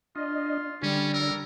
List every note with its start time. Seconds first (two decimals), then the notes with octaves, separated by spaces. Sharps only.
0.16 D4 F4 D#5
0.83 D3 G3 C#4
1.14 A4 A#4